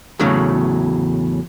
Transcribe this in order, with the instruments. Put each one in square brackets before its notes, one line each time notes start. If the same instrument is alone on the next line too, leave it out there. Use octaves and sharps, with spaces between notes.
[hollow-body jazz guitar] E2 A2 C#3 F#3